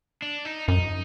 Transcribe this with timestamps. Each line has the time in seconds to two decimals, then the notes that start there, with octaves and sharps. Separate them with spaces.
0.22 D4
0.45 D#4
0.68 F#2 D#4